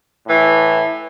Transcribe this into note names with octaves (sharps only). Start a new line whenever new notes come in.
A2 E3